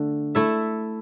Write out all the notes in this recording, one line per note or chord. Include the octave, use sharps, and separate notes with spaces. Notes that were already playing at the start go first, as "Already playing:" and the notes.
Already playing: D3 A3
A3 E4 A4 E5